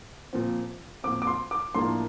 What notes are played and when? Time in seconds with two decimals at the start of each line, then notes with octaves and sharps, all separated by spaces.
0.33 A#2 F3 C4
1.04 A#2 F3 C4 D6
1.22 D6
1.27 C6
1.51 D6
1.75 A2 F3 A#3 D4 C6